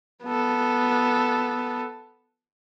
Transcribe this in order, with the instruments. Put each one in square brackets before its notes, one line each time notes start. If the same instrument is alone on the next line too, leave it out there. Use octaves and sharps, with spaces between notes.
[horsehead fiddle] B3 A4